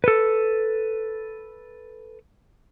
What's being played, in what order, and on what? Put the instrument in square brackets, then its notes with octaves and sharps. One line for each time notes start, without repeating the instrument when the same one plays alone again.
[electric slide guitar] A4 B4